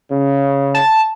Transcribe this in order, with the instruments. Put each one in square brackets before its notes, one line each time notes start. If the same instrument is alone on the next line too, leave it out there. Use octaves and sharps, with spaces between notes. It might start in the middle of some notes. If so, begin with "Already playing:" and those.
[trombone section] C#3
[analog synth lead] A5